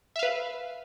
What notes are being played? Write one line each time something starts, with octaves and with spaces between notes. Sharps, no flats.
B4 E5 F5